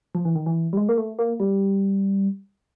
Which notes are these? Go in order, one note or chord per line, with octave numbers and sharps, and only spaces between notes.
F3
E3
D#3
E3
G3
G#3
A#3
A3
A#3
G3